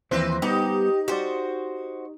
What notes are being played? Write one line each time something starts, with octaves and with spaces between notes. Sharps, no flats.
D#2 E3 F3 C4 B4 C5
G3 B3 D#4 G4
F#4 G4 C5 D5